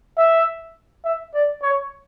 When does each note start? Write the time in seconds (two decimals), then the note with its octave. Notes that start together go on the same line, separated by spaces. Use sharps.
0.18 E5
1.05 E5
1.34 D5
1.63 C#5